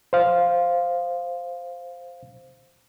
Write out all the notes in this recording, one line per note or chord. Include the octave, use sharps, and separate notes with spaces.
C5 F5